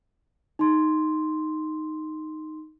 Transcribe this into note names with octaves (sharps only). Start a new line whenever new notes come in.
D#4 C6